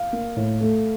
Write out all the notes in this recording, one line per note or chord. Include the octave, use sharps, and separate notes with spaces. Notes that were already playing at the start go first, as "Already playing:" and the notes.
Already playing: F5
A#3
A2
A3